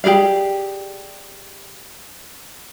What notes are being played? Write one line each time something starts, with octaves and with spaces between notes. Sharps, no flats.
G4 G#4 D5 F5